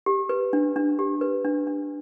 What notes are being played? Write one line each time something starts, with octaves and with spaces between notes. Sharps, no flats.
G4
B4
D4
D4
G4
B4
D4
D4